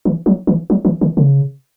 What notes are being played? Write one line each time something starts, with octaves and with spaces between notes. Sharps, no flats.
E3
F#3
E3
F#3
E3
D#3
C#3